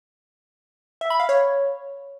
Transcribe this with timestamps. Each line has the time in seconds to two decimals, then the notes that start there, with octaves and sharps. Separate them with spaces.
1.01 E5
1.10 B5
1.20 F5
1.29 C#5